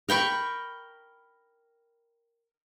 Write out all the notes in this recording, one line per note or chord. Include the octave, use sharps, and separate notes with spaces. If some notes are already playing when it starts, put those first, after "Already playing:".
A#4 G5 B5 C#6